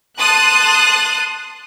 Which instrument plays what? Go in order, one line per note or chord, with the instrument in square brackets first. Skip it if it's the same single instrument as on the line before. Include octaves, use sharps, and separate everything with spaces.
[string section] A5 C6 D#6 F#6